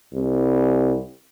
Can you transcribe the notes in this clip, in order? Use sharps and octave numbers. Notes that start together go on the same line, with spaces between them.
C2